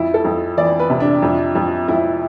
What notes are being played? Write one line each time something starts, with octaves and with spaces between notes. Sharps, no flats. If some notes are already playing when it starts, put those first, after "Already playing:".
Already playing: F2 E4
A4
F2
E3 D5
B4
C3
D4
F2
F2
F2 E4